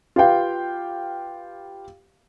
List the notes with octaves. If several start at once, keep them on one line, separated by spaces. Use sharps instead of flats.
F4 G4 B4 F5 G5